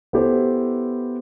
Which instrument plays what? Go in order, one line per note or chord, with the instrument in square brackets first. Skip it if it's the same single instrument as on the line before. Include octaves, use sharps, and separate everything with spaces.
[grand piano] B3 E4 G4 A4 B4 C5